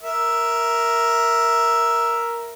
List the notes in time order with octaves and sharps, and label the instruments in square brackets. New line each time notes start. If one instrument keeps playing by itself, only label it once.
[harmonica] A#4 E5